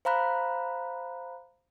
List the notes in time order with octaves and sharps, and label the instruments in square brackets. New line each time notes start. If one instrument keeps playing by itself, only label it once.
[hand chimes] C5 F5 A#5 B5 F#6